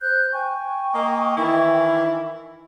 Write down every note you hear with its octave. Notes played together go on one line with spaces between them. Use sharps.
C5 F#6 G6
G5 G#5 C#6
A#3 D#5
D#3 E3 E4